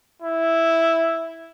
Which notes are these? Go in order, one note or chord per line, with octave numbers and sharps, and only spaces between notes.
E4